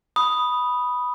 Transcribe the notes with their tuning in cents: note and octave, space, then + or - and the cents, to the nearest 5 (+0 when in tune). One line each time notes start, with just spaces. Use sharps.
B5 -5 D#6 +0